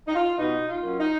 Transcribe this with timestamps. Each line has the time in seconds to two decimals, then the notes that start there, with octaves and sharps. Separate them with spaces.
0.08 D#4
0.15 F4
0.38 B2 D#4
0.68 F4
0.83 F#3 A#3 C#4
0.98 D#4